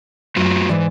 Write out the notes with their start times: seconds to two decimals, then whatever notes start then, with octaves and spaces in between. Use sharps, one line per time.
0.36 F#2 A3 F4 F#4
0.69 G#2 E3 D5